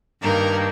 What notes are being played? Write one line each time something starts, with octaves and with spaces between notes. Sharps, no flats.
G2 D#3 A#3 A#4